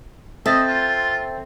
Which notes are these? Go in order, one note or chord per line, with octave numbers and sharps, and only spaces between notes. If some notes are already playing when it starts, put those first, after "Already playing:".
C4 A4 D#5 E5 A6
F4